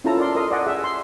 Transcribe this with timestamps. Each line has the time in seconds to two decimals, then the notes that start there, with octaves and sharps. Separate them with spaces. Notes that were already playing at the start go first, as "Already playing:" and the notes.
0.04 C#4 E4 F4 A4 A5 A#5
0.17 A#4 D5 C6
0.35 A4 A#4 D#5 C6 D#6
0.51 D5 D#5 F#5 G#5
0.66 G#4 E5
0.84 C6